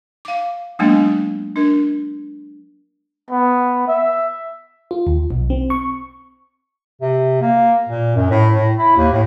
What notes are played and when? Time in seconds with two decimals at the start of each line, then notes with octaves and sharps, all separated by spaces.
0.25 F5 D6
0.79 F#3 G#3 A#3 B3 D4
1.56 D4 A#4
3.31 B3
3.88 E5
4.91 F4
5.07 D#2
5.31 B1
5.50 C4
5.70 C#6
7.01 C3
7.41 A#3
7.89 A#2
8.16 F#2
8.30 A2
8.53 A2
8.78 E4
8.97 D#2
9.12 A2